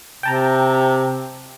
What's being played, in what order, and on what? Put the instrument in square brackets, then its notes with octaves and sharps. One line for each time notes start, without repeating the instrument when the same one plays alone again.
[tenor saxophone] C3 [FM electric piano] G5 A5 A#5